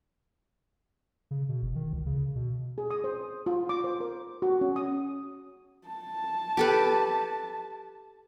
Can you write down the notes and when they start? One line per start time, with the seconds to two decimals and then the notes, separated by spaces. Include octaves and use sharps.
1.31 C#3
1.49 B2
1.62 F#1
1.76 D#3
1.93 C#2
2.06 C#3
2.36 B2
2.78 G#4
2.91 D#6
3.04 C5
3.46 F4
3.69 D6
3.84 C5
4.00 A#4
4.42 F#4
4.61 C#4
4.76 D#6
5.87 A5
6.57 G4 A4 B4